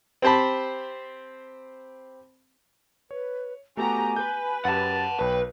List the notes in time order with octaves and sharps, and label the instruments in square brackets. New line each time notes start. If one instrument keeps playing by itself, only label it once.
[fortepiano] C4 G4 C5 A5 B5
[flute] B4 [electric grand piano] C#5
[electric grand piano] A3 B3 F#4 [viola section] G4 A#5 [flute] G#5
[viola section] B4 [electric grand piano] G6
[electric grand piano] F#2 G4 [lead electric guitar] F#5 A5 [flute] A6
[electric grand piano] B1 C#5 B5 [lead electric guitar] B4 [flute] G5